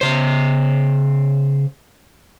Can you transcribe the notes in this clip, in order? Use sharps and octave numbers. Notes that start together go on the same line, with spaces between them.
C#3 C5